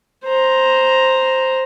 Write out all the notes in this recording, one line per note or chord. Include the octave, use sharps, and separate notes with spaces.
C5 A#5